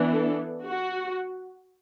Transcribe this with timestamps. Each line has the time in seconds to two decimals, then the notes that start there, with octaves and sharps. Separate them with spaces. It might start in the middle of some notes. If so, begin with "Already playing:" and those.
Already playing: E3 B3 D4
0.14 A4
0.64 F#4